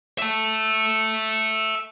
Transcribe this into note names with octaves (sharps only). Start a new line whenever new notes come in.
E5 A5